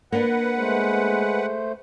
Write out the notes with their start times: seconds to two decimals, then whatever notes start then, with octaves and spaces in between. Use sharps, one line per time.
0.12 A#3 D4 B4 F#5
0.57 G#3 A3 C5